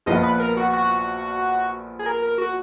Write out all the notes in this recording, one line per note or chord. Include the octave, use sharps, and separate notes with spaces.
A#1 A#2 F3 B3 F4 D#5
B4
A#4
F#4
F#4
G#4
A#4
A#4
F#4